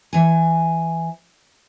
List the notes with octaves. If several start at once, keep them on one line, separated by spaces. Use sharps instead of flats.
E3 G#5